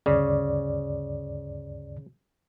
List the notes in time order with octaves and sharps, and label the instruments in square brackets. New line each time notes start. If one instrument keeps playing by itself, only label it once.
[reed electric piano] D2 G2 D5 [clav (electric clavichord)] C#3